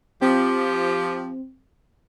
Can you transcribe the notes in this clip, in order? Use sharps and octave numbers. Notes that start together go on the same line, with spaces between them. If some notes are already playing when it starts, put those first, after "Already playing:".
F3 C4 G4